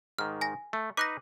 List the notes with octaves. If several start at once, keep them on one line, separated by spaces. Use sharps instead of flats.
G#2 D#3 F6
G#5 A#6
A3
D#4 B4 D6 F#6 A#6